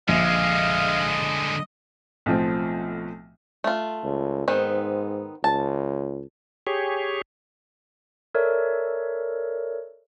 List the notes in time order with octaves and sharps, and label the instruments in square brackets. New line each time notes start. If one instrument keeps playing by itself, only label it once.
[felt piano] A#1 [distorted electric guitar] D3 G#3 [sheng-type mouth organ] D#5 [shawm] F5
[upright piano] B1 A2 F3 C4
[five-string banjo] A3 F4
[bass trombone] C#2
[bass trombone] G#2 [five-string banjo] D#3 B3 C4
[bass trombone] C#2 [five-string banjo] A5
[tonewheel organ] G4 G#4 C#5
[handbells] A4 A#4 C#5 D5 E5